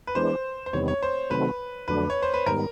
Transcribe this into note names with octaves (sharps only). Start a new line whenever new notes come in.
B4
E3 G#3 B3 D4 C5
C5
E2 C3 D#3 G3 B3 C#5
C#5
C5
C3 D#3 F#3 A3 C4 B4
F2 D3 F#3 A3 D4 B4
C#5
C5
B4
G#2 D#3 G3 B3 A#4